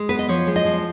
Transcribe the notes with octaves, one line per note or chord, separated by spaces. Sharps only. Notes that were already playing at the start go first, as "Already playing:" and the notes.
Already playing: G#3
B3 B4
D#5
F3 C#5
G#3
D#5
F3